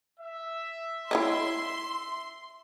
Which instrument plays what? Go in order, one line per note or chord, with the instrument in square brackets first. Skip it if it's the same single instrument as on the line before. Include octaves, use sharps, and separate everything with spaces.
[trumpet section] E5
[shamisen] E4 C#5 D#5 [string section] C6